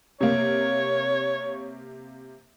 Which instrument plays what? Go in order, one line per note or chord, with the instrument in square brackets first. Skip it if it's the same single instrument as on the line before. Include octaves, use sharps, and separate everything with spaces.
[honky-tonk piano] C3 A#3 [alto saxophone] C#5